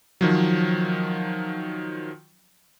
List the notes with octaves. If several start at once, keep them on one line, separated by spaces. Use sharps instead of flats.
D#3 F3 F#3